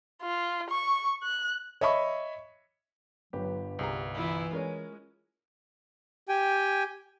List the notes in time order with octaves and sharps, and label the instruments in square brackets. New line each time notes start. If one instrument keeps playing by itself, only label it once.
[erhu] F4
C#6
F#6
[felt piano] C#5 D#5 E5 B5 C#6
[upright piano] G1 B4 [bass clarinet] F#3 [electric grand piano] G4
[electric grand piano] C2 G#4 A#5 [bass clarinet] G4
[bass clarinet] E3 [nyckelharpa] E4 F4
[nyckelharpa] G#3 [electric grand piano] C#4 [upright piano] A#4 C#5
[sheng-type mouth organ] G4 G5 G#5